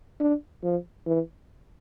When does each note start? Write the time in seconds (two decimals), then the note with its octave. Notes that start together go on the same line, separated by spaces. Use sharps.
0.20 D4
0.63 F3
1.06 E3